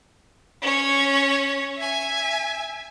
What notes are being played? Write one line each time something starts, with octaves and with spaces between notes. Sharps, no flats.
C#4 C#5
E5 G#5